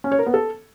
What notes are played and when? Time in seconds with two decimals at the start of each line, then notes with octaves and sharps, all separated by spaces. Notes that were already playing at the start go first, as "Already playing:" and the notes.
0.04 C#4
0.12 C#5
0.19 A#4
0.26 B3
0.34 A4